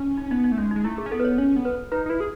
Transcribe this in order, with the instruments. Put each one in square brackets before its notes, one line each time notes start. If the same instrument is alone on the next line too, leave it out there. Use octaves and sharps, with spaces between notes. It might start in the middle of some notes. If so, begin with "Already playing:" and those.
Already playing: [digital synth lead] C#4
[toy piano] D#4
[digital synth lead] B3 [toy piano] D#4
[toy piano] D#4
[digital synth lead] A3
[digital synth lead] G#3 [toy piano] C#4
[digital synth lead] G#3 [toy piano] D#4
[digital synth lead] A3 [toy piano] E4
[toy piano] G#4
[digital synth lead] C#4
[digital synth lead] B3 [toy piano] A4
[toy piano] B4
C#5
[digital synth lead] C#4 [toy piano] C#5
[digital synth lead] B3
[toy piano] B4
[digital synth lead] D#4 [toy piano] B4
[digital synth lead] D#4
[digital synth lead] E4 [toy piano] B4
[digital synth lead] G#4